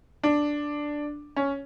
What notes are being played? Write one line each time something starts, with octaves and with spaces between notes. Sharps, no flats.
D4
C#4